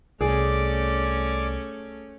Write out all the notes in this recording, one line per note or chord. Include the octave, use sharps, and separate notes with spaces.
C2 A3 C#4 G#4 D5 D6